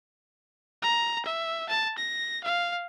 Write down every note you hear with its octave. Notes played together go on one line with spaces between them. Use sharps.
A#5
E5
A5
A#6
F5